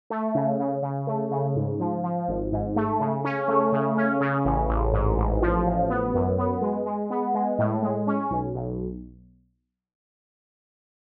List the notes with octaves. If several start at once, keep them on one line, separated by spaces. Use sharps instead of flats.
A3
C#3
C#3
C#3
A3
C#3
G#2
F3
F3
G#1
G#2
A3
C#3
C#4
A3
C#3
C#4
C#3
A1
A1
G#2
A1
F3
A1
B3
F#2
B3
G#3
G#3
B3
G#3
A2
G#3
C#4
B1
B1